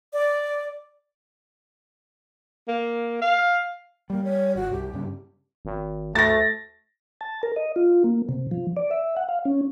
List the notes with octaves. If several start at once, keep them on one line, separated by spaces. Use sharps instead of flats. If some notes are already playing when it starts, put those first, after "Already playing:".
D5
A#3
F5
G3 A#3
C#5
G1 F#4
C2 G4
G2 C#3
G#1
D2 A3 A6 A#6
A5
A#4
D#5
F4
A#3
C3
F3
D5
E5
F#5
F5
C#4